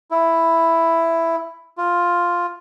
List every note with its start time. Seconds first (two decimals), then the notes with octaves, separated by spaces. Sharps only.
0.11 E4
1.78 F4